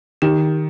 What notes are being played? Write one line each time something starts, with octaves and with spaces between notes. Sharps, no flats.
D#3 G4